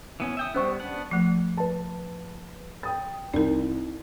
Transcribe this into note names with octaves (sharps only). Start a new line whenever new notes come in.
E3 B3 C#4
E5 G5 D#6
G3 B3 C#4 C5 C#6
B3 D4 F#5
F3 A3
B4 A5
G5 D#6 A6
C2 D#4 A#4